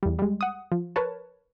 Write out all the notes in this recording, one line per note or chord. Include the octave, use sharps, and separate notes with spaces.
E2 G3
G3 G#3
F#5 D#6
F3
A#4 B4 C#5 A5